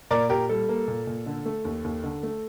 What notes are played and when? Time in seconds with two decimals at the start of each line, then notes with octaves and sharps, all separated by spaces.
0.11 A#2 A#4 D5
0.30 A#2 G4 A#4
0.49 G3 A4
0.69 A#3
0.88 A#2
1.07 A#2
1.26 D3
1.46 A3
1.65 D#2
1.84 D#2
2.04 D3
2.23 A3